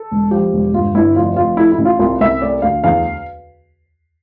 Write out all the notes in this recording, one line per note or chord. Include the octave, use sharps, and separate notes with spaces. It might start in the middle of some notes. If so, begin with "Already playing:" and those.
Already playing: A4
E1
F3 G4
E1
G1 F4
G1 E4
F1 F4
F1 F4
A3 E4
E4
A1
F4
C2 F4
C2 E5
A3 D5
D2 F5
E2 F5